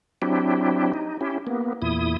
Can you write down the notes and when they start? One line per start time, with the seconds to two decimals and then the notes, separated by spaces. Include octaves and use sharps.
0.22 F#3 C4 D4 E4 G4
0.94 D#4
1.21 C#4 E4 G4
1.47 A#3 B3
1.82 E2 A#2 E4 D#6